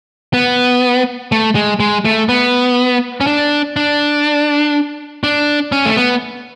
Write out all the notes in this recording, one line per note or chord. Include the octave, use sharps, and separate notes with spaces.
B3
A3
G#3
G#3
A3
B3
C#4
D4
D4
D4
C#4
A3
B3